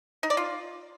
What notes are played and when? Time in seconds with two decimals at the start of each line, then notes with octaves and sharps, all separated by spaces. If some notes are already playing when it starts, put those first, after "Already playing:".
0.23 D#4
0.30 D5
0.37 F4